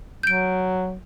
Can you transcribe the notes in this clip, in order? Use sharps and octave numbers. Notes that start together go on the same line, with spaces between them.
F#3 G6 D7